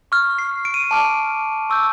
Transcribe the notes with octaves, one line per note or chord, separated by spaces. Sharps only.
C#6 F6
C7
D7
D#7
D7
A5 D6 F6
C#6 E6 G6